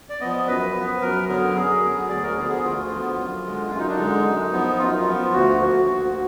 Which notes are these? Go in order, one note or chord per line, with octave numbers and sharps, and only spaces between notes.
D5
F3 B3 D#5
F#2 B4
F3 B3
F#2 A#4
D3 F#3 B3 A#4
F#2 G#4
D3 F#3 B3
D2 D5
G#4
A#4
D3 F3 B3 G#4
G#4
D2 F4
D3 F3 B3
F#2
D3 G#3
F#2 F4
D#4
D4
D3 G#3 D#4
F#2
F3 B3
F#2 F4
D#4
F4
F3 B3
D2 F#4
D3 F3 A#3
D2 F#4